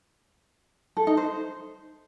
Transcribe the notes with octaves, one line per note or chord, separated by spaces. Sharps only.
A4
D#4
C5